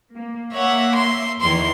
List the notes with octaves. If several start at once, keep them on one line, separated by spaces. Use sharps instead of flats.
A#3
A#3 C#5 E5 F#5
C6
E2 D#3 E3 C6